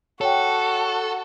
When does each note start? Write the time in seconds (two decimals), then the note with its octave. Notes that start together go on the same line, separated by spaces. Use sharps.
0.21 F#4 A4 C#5 G5